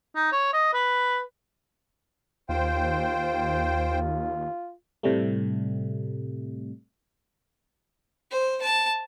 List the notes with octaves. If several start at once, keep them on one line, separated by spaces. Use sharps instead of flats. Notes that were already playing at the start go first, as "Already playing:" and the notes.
D#4
C#5
D#5
B4
D#2 F4 C5 G5
A2 C3 G3 A3
C5
A5